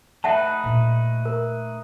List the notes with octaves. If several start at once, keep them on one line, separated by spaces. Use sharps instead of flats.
A3 D#4 B4 E5 F#5 A5
A#2 D4
A#4